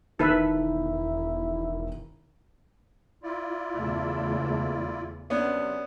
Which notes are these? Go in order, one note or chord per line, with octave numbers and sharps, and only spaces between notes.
E1 D#3 E4 A4 B4 E5
E4 F4 D5
E2 C#3 A3
F#2 C3 B3 C#4 D4